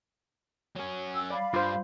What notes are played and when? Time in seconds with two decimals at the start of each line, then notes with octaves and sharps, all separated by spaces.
0.76 F#3 C#4
1.14 G5 E6
1.30 D5 F5 B5
1.54 G2 F4 C5